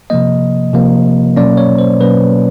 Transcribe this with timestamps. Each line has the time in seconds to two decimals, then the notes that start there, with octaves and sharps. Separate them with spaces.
0.10 C3 F3 A#3 D#5
0.73 C3 F3 A#3
1.36 B2 F#3 A#3 C#4 D5
1.57 C#5
1.78 C5
2.00 B2 F#3 A#3 C#4 B4